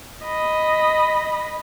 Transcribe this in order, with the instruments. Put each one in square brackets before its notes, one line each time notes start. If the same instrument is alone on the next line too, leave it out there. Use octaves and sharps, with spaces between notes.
[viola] D#5 B5